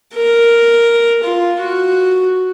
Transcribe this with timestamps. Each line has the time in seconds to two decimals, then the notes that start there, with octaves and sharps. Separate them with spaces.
0.14 A#4
1.23 F4
1.60 F#4